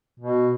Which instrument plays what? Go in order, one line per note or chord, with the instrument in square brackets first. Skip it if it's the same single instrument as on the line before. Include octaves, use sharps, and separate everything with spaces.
[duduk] B2